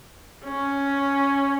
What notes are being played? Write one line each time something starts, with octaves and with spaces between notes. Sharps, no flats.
C#4